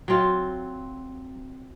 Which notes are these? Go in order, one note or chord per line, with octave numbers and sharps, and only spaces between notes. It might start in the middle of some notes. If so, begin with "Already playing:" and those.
F#3 C4 F4